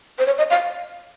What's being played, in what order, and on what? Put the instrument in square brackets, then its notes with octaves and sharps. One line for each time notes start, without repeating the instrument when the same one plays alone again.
[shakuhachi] C5
C#5
D#5
F5